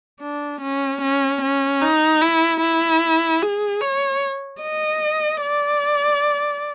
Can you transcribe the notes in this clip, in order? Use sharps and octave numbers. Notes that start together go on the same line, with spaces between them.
D4
C#4
C#4
C#4
D#4
E4
E4
G#4
C#5
D#5
D5